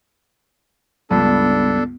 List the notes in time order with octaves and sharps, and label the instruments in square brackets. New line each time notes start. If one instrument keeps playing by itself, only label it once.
[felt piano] C#2 G2 [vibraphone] B3 [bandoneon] D4 A4